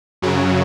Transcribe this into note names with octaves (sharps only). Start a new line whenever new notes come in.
F#2 C#3 F#3